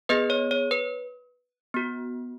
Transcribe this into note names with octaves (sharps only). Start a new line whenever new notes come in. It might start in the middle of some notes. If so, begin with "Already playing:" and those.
B3 G#4 B4 D#5
C#5
C#5
B4
B3 F#4